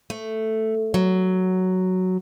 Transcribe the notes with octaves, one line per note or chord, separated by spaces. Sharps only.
A3
F#3